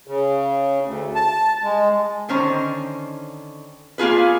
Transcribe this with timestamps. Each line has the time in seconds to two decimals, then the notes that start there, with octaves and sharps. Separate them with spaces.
0.07 C#3
0.85 D2
1.15 A5
1.64 G#3
2.29 D3 D#3 C#4 C5 A#5
3.98 A#3 B3 F4 G#4 B4